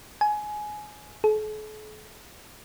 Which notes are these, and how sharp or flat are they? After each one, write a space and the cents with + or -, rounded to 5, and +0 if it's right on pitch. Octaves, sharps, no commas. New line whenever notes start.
G#5 +20
A4 -45